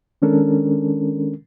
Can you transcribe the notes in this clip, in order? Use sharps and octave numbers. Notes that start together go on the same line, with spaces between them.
D#3 G#3 C#4 D4 A4 A#4